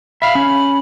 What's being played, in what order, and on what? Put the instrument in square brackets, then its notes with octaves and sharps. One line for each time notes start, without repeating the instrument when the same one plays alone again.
[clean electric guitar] E5 F5 [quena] B5
[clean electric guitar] C#4